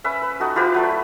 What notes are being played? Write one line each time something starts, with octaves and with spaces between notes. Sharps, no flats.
C#4 B4 E5 F#5
B4
D#4 F#4 A4
E4 F4 G4 B4
F#3 A3 D5